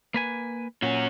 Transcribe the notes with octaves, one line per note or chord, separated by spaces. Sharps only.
A#3 B4 G#5
A#2 C#4 F#4